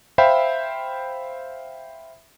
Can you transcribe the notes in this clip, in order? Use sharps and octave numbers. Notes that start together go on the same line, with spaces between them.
C5 E5 F5 G5 B5